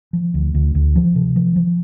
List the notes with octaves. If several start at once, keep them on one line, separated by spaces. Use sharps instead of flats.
F3
D2
D2
D2
F3
C3
F3
F3